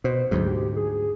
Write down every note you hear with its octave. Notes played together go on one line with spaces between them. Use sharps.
B2 C5
D2 G#2 F#3
G4
G#4